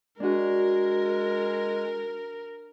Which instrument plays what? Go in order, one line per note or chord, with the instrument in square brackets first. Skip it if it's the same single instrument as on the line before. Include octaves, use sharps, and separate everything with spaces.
[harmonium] G#3 [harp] D4 F#4 [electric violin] A#4